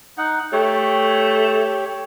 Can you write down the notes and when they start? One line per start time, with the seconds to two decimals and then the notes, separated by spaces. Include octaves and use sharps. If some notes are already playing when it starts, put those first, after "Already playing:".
0.18 D#4 F#5
0.52 A3 G4 C#5